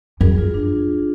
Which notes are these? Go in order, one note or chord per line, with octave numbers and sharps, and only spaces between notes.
F#2 G#4
F4
D4